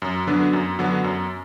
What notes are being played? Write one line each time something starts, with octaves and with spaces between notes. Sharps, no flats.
F#2
D3 F#3 B3 D4
F#2
D3 F#3 B3 D4
F#2